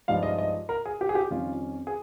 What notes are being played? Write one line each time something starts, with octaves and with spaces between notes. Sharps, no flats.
G2 F3 G#3 D#4 F5
D#5
D#5
A#4
G#4
G4
G#4
G4
F2 D#3 G3 C#4 F4
G#4